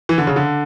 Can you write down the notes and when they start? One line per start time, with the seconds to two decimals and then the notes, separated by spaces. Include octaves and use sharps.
0.09 E3
0.18 D3
0.27 C#3
0.36 D3